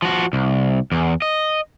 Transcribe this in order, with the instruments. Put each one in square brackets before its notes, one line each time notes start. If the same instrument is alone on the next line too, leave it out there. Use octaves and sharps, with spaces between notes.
[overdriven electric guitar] F3 F#4
C2
E2
D#5